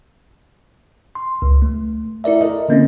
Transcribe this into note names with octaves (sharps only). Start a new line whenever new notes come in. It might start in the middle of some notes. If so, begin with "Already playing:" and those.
C6
C#2
A3
E4 A#4 D5 E5
A4 A#4 D#5
D3 A#3 C4 C#4